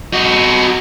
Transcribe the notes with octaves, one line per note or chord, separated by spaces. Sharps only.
D#4 F#4